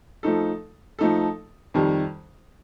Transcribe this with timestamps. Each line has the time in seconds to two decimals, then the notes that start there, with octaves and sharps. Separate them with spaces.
0.23 F3 A3 D#4 A4
0.99 F3 A3 D#4 A4
1.74 F2 D#3 G3